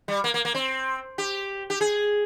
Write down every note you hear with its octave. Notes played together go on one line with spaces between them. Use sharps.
G3
A#3
A#3
A#3
C4
G4
G4
G#4